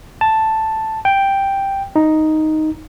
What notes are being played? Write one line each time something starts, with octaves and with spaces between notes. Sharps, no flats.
A5
G5
D#4